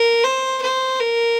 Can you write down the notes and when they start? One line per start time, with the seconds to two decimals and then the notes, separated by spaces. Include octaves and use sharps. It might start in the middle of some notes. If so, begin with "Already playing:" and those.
Already playing: A#4
0.24 C5
0.62 C5
1.00 A#4